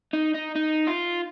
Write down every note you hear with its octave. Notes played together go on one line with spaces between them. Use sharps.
D#4
D#4
D#4
F4